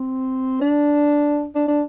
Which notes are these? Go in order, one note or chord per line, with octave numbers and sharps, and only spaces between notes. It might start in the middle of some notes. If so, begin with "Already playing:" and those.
Already playing: C4
D4
D4
D4